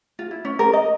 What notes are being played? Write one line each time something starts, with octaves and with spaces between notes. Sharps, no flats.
F4
E4
C#4
A#4
D#5